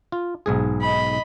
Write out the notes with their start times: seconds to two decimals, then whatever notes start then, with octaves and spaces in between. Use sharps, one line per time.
0.12 F4
0.46 B1 G#2 G#4
0.81 D#5 B5